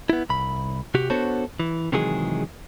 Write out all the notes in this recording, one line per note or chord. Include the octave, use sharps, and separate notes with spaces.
B3 E4
C2 B5
C3 F#4 G4
B3 D4 F#4 A4 C5 C#5
E3
C3 D#3 E3 F#3 G#3 G#4